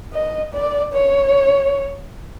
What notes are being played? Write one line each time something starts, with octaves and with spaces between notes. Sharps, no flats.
D#5
D5
C#5